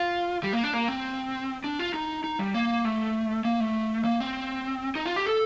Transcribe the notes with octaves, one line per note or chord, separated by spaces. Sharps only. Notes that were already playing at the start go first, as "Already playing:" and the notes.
Already playing: F4
G3
A#3
D4
A#3
C4
D4
F4
D#4
D#4
G3
A#3
A3
A#3
A3
A#3
C4
D#4
F4
G4
A4